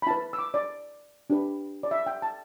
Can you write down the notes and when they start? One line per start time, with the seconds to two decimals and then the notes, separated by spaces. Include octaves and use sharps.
0.02 B5
0.07 E4 B4 A5
0.33 E6
0.39 D6
0.54 D5
1.30 D4 G4 B4
1.83 D5
1.91 E5
2.06 G5
2.22 A5